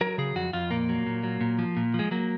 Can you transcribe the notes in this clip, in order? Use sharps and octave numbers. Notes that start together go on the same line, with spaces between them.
F#3 A#4
C#3 G#4
F2 F#4
F2 F4
A#2 A#3
F#3
A#2
F#3
A#2
F3
A#2
F3
G#3
F#3 A#3